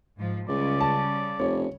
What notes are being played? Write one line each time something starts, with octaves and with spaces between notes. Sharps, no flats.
G#2 F3
C#2 C#3 G3 D5
A5
F1 C#5